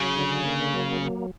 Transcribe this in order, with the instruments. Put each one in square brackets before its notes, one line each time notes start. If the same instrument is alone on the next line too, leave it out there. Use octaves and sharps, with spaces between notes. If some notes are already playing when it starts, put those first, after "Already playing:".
Already playing: [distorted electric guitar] C#3 [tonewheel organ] F#3
[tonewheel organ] D3
A#3
F#3
A#3